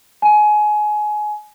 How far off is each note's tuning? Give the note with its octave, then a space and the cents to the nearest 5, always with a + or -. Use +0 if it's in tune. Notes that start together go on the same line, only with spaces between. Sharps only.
G#5 +25